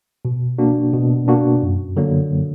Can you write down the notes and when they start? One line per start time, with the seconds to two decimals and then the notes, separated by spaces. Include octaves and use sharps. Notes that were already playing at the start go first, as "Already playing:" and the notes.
0.25 B2
0.59 A#3 D4 F#4
0.93 B2
1.28 A#3 D4 F#4
1.62 F#2
1.97 D3 F#3 A#3